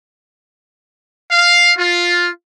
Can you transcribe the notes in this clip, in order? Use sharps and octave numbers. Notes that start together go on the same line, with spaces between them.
F5
F4